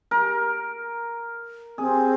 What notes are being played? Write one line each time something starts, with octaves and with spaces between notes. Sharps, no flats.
A#4
C4 G#4